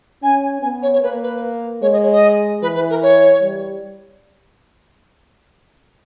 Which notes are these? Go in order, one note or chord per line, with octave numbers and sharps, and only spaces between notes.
C#4 G#5
B3 G#5
C#5
C#5
A#3 B4
B4
G#3 C#5
D#5
C#5
D#5
E3 B4
B4
A#4
C#5
G3